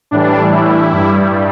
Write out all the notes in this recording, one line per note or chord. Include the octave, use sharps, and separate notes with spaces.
A2 E3 G3 D4
E4
G2 G3